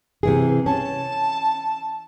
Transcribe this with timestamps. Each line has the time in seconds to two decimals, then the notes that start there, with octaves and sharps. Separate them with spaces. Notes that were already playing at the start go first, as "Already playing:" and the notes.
0.23 C3 E3 G#4
0.66 C#4 A5